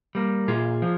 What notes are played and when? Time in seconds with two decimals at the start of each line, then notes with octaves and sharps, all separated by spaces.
0.15 G3 A#3
0.48 A#2 F4 G#4
0.82 F3